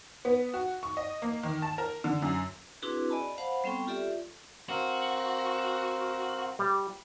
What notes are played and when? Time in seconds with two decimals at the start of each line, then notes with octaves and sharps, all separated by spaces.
0.25 B3
0.54 F#4
0.83 C#6
0.97 D#5
1.22 A#3
1.43 D#3
1.62 A5
1.78 A#4
2.04 D3
2.22 F#2
2.82 C4 D4 E4 F#4 G#4 B4
3.10 D5 D#5 G#5 A5 B5
3.38 C5 F5 F#5 A5 B5
3.64 G3 B3 C4 A4 G5 C#6
3.87 F4 G4 A4 D5 E5
4.69 C4 F#4 A#4 F5
6.59 G3